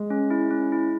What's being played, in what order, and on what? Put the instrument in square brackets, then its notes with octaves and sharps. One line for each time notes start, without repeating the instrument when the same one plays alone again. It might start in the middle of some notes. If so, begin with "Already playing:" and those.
Already playing: [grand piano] G#3
[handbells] C#4
E4
C#4
E4